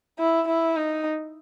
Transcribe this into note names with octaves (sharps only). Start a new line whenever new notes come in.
E4
E4
D#4